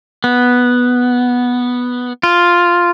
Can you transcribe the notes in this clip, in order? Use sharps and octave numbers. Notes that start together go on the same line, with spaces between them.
B3
F4